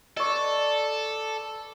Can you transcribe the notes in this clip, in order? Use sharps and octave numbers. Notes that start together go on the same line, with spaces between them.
A4 B4 D5 D#5 C#6